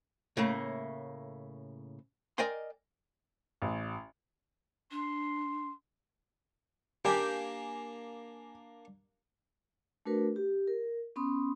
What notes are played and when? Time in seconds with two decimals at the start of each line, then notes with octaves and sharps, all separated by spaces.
0.37 A2 C#3 A3 A#3
2.38 A#4 D5 D#5 G5 G#5 C6
3.62 A1
4.91 D4 C6
7.05 A#3 D4 G4 G#5
10.06 A3 D4 F#4 A#4 B4
10.36 G4
10.67 A#4
11.16 B3 C#4 B5 C6 D#6